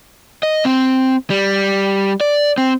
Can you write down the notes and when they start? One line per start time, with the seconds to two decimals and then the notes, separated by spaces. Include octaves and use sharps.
0.43 D#5
0.65 C4
1.30 G3
2.21 D5
2.58 C4